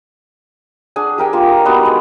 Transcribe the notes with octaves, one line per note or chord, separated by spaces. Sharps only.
D4 G#4 F#5 G#5
G4 A#4 G5 G#5
A#3 F4
A#5
G3 B3 D#4 F#4
G#3